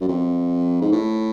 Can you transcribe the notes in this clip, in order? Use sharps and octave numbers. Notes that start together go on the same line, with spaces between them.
F#2
F2
G#2
A2